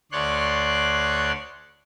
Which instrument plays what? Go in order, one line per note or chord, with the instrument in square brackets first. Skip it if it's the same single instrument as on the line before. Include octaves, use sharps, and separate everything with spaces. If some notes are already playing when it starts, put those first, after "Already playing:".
[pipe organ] D2 C#5 D5 C6 F#6